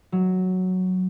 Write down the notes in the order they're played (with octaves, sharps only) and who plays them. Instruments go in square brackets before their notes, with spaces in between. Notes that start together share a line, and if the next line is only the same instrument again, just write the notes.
[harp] F#3